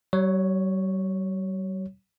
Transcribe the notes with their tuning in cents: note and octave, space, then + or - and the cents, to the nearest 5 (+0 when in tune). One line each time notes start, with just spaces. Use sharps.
G3 -45 C#5 +0